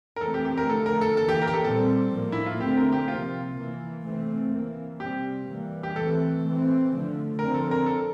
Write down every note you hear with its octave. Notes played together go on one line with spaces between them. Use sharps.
A#4
E3 A3 C4 A4
G4
G4
A#4
D3 F3 A3 A4
A#4
A4
E3 A#3 A4
G4
A#4
G4
A4
A#2 G3 C4 A4
A2 F3 A#3
E4
F4
D3 A3 C4 G4
A#4
G4
C3 F3 A#3 F4
E3 A#3
C3 E3 A3 C4
E3 A#3
C3 G3 C4 G4
E3 G3 A#3
G4
E3 A3 C4 A4
E3 A3 C4
D3 F3 A3
D3 F3 C4 A#4
A4
A#4
A4